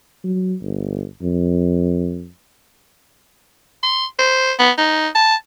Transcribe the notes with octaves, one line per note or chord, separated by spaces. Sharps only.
F#3
G1
F2
C6
C5
B3
D#4
A5